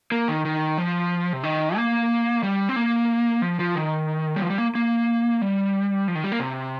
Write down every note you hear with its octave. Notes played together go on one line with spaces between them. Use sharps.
A#3
D#3
D#3
F3
C3
D#3
A#3
G3
C4
A#3
F3
F3
D#3
G3
F3
G3
A#3
A#3
G3
F3
D#3
G3
A#3
C3